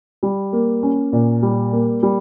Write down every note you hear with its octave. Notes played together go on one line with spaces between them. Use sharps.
G3
A#3
C#4
A#2
G3
A#3
G3